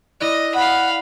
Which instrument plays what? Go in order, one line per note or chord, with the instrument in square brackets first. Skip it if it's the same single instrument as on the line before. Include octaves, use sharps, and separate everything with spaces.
[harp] E4 D5 F#6 [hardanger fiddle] D#5
[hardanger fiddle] F5 B5 [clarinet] F#5